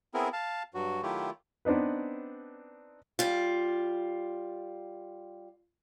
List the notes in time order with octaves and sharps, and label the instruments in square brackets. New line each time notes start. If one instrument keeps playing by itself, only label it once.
[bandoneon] B3 C4 E4 G#4 A#4
F5 A5
G2 F#3 F#4
D#3 F#3 A3 E4 F4 G4
[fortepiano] B3 C4 D4 D#4 B4
[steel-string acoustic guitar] G3 F4